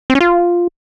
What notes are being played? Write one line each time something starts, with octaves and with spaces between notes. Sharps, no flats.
C4
C#4
F4